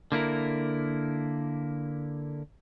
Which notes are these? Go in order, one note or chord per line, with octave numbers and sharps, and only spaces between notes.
D3 A#3 E4 A#4